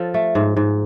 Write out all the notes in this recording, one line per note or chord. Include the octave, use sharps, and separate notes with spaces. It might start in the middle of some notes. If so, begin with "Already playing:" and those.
Already playing: F3 A4
A3
G#2
G#2